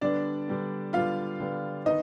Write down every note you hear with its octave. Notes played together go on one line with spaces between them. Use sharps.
D3 G3 B3 D4 D5
D3 G3 B3
D3 G3 B3 F4 F5
D3 G3 B3
D#3 B3 D#4 D#5